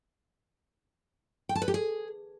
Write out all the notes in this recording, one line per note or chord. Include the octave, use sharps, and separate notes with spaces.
G5
A5
B4
G4
G#4